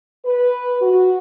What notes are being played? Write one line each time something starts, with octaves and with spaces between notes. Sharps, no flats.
B4
F#4